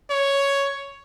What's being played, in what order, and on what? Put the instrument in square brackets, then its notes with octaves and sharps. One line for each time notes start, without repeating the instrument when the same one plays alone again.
[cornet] C#5